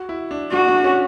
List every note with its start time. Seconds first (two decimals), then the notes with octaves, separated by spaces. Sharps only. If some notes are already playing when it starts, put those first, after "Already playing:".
Already playing: F#4
0.09 E4
0.31 D4
0.52 D4 F#4
0.68 D4
0.84 C#4